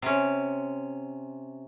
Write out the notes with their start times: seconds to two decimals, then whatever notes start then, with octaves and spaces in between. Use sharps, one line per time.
0.02 C3 C#4